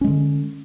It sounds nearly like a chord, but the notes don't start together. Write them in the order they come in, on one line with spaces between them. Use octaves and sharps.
C#4 G#3 D3